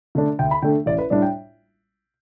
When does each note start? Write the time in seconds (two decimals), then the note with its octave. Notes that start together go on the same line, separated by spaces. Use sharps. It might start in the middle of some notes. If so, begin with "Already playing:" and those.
0.15 D3 A3 D4
0.39 D2 G5
0.51 B5
0.62 D3 A3 D4 G5
0.86 A1 D5
0.98 B4
1.10 A2 G3 D4 D5
1.22 G5